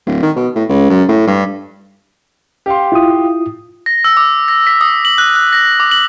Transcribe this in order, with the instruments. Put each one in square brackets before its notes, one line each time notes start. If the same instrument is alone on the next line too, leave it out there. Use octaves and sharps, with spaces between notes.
[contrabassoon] D1
D#3
B2
A2
C#2
F#2
A2
G2
[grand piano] G4 F5 C6
[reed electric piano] E4 F4 D#6
[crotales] A#6
E6
D6
A#6
B6
D#6
F#7
F#6
F#6
A#6
D6
F#7